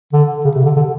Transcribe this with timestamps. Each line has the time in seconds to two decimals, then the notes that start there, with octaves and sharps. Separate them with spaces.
0.13 D3
0.45 C#3
0.55 C3
0.65 D3
0.76 D3